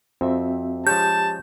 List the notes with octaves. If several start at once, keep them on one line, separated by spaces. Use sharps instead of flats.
F2 C4 F#4 E5
F3 G#3 C#4 G4 A5 G6